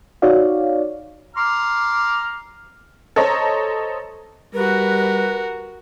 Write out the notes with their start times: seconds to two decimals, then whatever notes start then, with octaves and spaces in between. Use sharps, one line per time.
0.22 D#4 F#4 C#5 D5 F5
1.36 A#5 C6 D6 F6
3.16 A4 C5 C#5 D#5 A#5
4.54 G3 F#4 A#4 B4